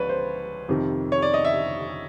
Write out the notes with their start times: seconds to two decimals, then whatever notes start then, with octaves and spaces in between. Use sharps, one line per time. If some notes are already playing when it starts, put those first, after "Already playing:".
Already playing: C#2 F3 B4 C#5 D5
0.09 C5
0.68 F2 C3 D#3
1.12 C#5
1.22 D5
1.34 D#5
1.45 E5